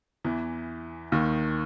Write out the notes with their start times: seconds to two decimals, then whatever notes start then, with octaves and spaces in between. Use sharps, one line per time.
0.24 E2 E3
1.12 D#2 D#3